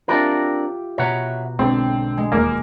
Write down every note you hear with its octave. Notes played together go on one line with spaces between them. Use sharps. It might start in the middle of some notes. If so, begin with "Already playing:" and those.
C4 D4 F4 G4 A#4 E5
B2 C#5 E5 F#5 A#5
B1 G#2 D3 C4
G#3
E1 D#2 A#3 A#4 D6